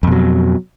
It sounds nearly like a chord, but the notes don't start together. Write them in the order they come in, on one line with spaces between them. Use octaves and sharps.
F2 B2 F#3